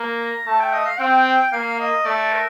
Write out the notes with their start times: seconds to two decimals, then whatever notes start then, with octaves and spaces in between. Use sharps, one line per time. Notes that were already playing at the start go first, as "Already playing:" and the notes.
Already playing: A#3
0.20 A#5
0.46 A3 A5
0.60 G5
0.73 D#5
0.86 F5
1.00 C4 G5
1.52 A#3 F5
1.80 D#5
2.05 A3 D5
2.32 A#4